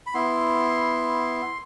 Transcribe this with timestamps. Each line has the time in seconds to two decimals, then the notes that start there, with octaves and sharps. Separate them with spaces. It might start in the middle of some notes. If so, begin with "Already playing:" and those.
0.07 B5
0.14 B3 E4 C6